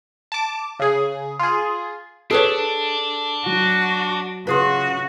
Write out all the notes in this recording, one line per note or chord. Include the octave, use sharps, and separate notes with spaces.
A5 D6
C#3 G#4
F4 G#4
D4 G#4 A4 B4 C#5
F#3 F#4
C#3 F4 F#4 G#4 B4